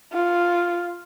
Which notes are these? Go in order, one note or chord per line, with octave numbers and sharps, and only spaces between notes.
F4